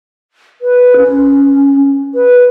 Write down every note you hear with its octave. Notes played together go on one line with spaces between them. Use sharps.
B4
C#4
B4